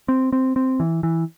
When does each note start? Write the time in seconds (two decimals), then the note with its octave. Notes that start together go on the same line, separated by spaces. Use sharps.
0.08 C4
0.33 C4
0.56 C4
0.80 E3
1.03 E3